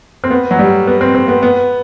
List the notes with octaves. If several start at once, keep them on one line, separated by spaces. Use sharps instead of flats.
C4
B3
F#3
G3
B3
C4
C4
B3
B3